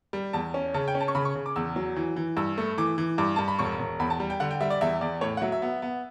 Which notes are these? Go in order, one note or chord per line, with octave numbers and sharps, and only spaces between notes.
G3
E2 A5
C#4
C#3 A5
G5
C#4
A5
C#6
C#3 B5
C#6
C#3
D6
E2 E6
F#3
E3
E3
G2 E6
A3
E3 D6
E3
G2 D6
G2 A5
B5
E1 C#6
E1
E2 B5
A5
G3
G5
D3 F#5
G5
G3 E5
D5
E2 E5
E2 D5
A2 C#5
F#5
F#3 E5
E5
B3
B3